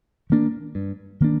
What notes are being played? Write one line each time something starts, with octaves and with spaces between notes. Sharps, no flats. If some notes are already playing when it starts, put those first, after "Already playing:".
D#3 A#3 D4
G2
D#3 A#3 D4